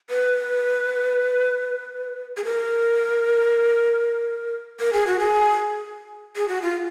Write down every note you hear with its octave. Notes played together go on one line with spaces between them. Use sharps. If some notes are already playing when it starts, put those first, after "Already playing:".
B4
G#4
A#4
A#4
G#4
F#4
G#4
G#4
F#4
F4